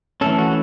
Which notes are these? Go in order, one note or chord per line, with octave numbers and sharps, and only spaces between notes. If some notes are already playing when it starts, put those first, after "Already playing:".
E3 A3 C#4 A4
F#4